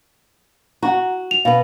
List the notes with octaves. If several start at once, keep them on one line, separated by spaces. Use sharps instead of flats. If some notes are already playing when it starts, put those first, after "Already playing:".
F#4 F#5 A#5
F7
B2 B4 F5